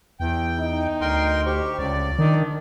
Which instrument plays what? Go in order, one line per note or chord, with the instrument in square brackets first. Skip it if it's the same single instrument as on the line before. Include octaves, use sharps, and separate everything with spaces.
[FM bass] E2 [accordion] G5
[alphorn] D#4
[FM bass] D2 [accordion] A#4 G5 C6
[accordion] G4 C#6 [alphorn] C5
[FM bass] C#2 [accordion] D5
[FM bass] D#3 [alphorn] D4